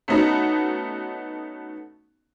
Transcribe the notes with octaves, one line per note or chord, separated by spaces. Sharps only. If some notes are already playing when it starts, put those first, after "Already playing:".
A3 B3 C#4 D#4 F#4